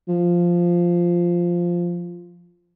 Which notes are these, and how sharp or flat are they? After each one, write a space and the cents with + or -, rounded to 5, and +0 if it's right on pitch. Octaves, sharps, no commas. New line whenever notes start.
F3 -5